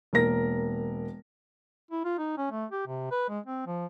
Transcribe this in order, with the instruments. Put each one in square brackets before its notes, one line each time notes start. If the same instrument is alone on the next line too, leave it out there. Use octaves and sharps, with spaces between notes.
[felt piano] E1 A#3 A#4 A#6
[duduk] E4
F4
D#4
C#4
A3
G4
C3
B4
G#3
C4
F3